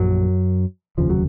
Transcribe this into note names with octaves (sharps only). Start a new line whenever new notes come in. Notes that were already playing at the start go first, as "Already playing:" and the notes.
Already playing: A#1 F#2 F#3
F1 D#2 C#3 F3
F#3